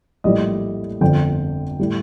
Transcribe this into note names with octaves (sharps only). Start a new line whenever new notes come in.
A#1 A2 G3 D#5
G1 F2 D3 F3 G5
A2 G3